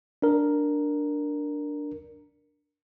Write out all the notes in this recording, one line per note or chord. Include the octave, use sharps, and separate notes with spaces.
D4 A#4